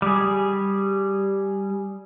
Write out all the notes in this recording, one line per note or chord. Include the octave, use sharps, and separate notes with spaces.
G3 G#4